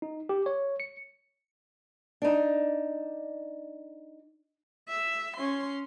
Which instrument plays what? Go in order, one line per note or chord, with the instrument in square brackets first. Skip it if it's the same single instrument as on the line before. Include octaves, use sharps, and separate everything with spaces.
[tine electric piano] D#4
G4
C#5
C#7
[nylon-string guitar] D4 D#4
[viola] E5
C#4 C6